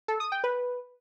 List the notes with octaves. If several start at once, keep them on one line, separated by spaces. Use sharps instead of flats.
A4
D#6
G5
B4